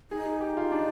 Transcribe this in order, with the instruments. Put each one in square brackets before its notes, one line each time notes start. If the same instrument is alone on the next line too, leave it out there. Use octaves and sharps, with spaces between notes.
[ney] D#4 [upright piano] G#4
[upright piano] G#4
G4
F4
D4